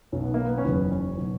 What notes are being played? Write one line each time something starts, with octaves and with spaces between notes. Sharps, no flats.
B1 B2 F#3 C#4
B3
A#3
B3
C#4
F#1 E2 D#3 F#3 B3
C#4
B2 F#3